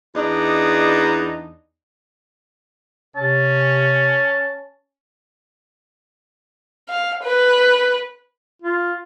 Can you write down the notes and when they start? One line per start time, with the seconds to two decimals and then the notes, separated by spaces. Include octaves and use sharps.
0.15 E2 D4 D#4 D5 D#5
3.16 C3 C#4 A5
6.88 F5
7.23 B4
8.62 F4